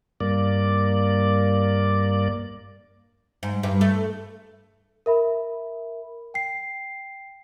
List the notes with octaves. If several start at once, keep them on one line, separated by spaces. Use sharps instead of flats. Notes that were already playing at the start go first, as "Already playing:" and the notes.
G2 A#3 D5
G#2
G2
A3
A#4 E5 B5
G5 C7